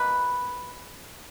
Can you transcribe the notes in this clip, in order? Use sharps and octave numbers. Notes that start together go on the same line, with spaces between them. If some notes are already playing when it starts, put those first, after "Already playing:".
Already playing: B2 A#3 B4